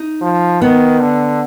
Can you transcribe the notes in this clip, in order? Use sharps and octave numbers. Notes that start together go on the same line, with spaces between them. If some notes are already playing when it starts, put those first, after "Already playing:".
Already playing: D#4
F3
D#3 B3
D3